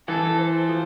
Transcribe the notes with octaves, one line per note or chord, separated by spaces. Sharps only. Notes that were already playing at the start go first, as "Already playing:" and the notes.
E3 A4
C5
F3